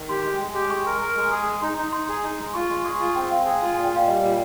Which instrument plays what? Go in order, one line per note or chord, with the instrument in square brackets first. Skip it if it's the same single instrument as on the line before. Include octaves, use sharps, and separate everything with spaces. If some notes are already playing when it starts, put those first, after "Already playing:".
Already playing: [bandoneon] D#3
[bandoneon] G4 [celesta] C6
[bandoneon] G#3
G#3
G4
[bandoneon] G#3 [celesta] C#6
[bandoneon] A#4
A#4
G#3
[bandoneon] G#4 [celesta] D#6
[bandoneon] G#3
[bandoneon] D#4 [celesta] C6
[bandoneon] D#4
[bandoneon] D#4 [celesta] C6
[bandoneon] G#4
D#4
G#3
[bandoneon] F4 [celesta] C#6
[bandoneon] G#3
[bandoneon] G#4 [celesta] C#6
[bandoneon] F4
[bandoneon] C4 [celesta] G5
[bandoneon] G#3 [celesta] F5
[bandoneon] G#4
F4
[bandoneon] A#2 [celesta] G#5
[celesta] G5
[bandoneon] A#2 [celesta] F5
[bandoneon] G3 [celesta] D#5
[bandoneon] A#2